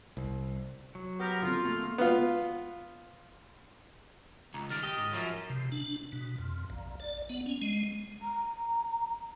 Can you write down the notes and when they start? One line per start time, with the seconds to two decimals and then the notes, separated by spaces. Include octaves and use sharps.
0.17 C2
0.95 F#3
1.20 B3 G4 A#4
1.42 D3 C4 F4
1.65 A3 A#3
1.98 B3 F4
4.54 C#2 A#5
4.70 D#3 G3 F6 A6 D7
4.83 G4 D#5
4.98 G#2
5.13 F#2 F3
5.50 C3
5.72 D4
6.12 B2
6.38 F2
6.70 A#1
7.00 D5
7.30 B3
7.46 C#4
7.62 G#3
8.22 A#5